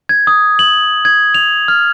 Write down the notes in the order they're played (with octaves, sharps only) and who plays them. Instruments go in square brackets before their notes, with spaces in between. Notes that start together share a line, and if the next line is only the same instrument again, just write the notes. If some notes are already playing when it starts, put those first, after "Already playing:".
[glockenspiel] G#6
D#6
F#7
G#6
F7
F6